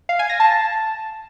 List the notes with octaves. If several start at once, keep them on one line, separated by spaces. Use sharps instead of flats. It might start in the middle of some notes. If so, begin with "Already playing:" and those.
F5
G#5
A#6
A5